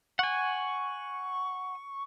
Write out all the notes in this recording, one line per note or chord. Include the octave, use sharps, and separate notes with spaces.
F#5 G#5 C#6